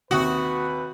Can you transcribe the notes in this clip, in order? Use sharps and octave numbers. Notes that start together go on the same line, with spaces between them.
D#2 C3 F#4 B4 D#6